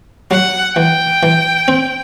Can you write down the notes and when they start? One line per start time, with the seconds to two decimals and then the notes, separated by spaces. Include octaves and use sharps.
0.31 F#3 F#5
0.76 E3 G5
1.23 E3
1.68 C4